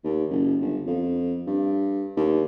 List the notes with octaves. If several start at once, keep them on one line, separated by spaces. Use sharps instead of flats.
D#2
F#1
G1
F2
G2
D#2